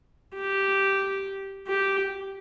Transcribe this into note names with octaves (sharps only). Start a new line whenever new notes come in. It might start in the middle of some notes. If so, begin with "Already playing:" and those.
G4
G4